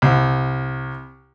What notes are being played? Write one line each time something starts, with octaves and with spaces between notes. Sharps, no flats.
C2